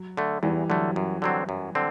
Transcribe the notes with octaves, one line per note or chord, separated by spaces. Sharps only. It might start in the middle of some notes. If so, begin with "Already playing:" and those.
Already playing: F#3
D3 A3
E2 E3 G3
D3 F#3 A3
F#2
D3 F#3 C4
F#2
D3 C4